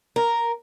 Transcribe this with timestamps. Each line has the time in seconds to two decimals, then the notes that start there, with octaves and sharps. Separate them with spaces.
0.16 A#4